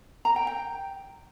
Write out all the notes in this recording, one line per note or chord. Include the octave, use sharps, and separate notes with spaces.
A#5
G5
G5